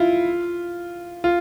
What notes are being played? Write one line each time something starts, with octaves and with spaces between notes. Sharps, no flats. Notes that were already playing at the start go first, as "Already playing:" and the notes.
Already playing: E4 F4
F4